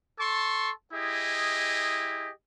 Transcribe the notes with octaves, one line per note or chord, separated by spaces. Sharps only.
A4 A5 C6 C#6
E4 G4 G#4 D#5